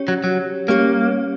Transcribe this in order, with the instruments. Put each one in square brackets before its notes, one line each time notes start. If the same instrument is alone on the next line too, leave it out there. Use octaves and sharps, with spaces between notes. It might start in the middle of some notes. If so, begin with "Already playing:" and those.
Already playing: [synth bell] C#4 G4 C#5
[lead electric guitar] F#3
F#3
[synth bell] G3 C#4 G4 C#5 [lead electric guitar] A#3